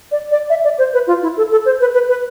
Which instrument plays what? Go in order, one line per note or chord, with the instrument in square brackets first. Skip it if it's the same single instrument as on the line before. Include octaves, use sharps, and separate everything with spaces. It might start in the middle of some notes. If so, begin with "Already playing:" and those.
[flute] D5
D5
E5
D5
C5
B4
F4
E4
A4
A4
C5
B4
B4
B4